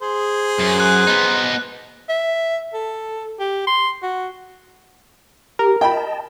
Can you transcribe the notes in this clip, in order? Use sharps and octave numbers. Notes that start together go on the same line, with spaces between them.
G#4 C5
F#2
F#6
B3 D#4
E5
A4
G4
C6
F#4
G4 A#4
D#5 G5 A5 B5